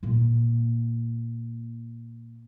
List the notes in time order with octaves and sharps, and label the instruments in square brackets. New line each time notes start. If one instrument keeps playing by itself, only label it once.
[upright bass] A#2 A#3